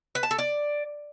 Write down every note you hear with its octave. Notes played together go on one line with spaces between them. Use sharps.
B4
A5
A4
D5